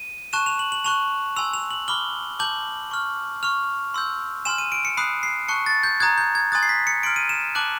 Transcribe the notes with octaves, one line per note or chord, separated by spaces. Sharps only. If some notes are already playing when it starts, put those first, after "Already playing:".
Already playing: D#7
A5 C#6 F#6 E7
F7
F#7
F#7
A5 C#6 F#6 F7
G#5 C6 E6 F7
F7
F#7
B5 D6 F6 G7
A5 D6 G6 F#7
C#6 F6
C#6 F6 F7
C6 E6 G6
G#5 C6 F6 E7
D#7
D7
C#7
B5 D#6 F#6 C7
C7
A5 C#6 F#6 C#7
A6
G6
A#5 D#6 F#6 G#6
G6
G#6
G#5 C6 D#6 F#6 A6
C7
B6
C#7
C6 F6 D7
D#7
E7
A5 D6 F#6 F#7